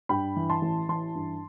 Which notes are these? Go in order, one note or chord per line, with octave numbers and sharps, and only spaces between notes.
G2 G5 B5
E3
A5 C6
A1
E3 A5 C6
G2